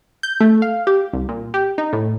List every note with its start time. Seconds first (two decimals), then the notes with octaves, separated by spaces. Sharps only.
0.23 G6
0.40 A3
0.62 F5
0.87 G4
1.13 C2
1.29 A#2
1.54 G4
1.78 D#4
1.93 A2